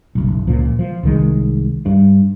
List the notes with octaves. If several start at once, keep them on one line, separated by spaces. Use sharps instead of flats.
F#1 B1
C#2 A#2 F3
F3
C2 D#3 G#3
G2